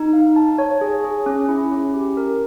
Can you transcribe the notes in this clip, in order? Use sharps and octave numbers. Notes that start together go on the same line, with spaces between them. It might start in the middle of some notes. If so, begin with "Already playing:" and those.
Already playing: D#4
F5
A5
C#5
G#4
G#4
C#4
E4
C#4
G4
A#4